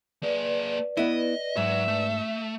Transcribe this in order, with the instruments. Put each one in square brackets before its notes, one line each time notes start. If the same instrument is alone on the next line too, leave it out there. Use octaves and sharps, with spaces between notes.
[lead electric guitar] A#3 G#4 [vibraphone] B4 D5
[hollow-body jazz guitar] B3 E4 [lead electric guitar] D#5
[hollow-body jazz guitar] G#2 [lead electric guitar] F#3 [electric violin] E5
[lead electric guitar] A3